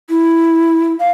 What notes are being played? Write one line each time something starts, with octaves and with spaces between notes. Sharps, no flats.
E4
F5